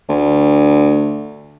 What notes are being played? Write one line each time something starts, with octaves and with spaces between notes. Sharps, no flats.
D2